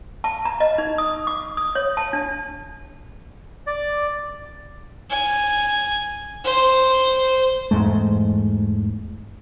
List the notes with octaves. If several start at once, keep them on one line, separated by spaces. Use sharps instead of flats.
A5
A#5
D#5
D#4
D#6
D6
D#6
C#5
A5
D4
D5
G#5
C5
E2 G#2 G#3 A3